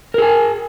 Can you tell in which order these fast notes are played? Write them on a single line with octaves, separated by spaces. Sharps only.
A#4 G#4 G#5